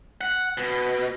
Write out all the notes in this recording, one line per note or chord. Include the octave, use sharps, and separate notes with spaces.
F#5
B2